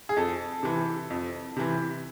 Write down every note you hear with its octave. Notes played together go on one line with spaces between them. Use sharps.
G#4
F2 A4
C3 E3
F2
C3 E3